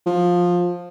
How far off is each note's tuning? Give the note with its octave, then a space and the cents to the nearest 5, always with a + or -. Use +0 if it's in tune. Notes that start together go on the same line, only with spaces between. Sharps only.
F3 +15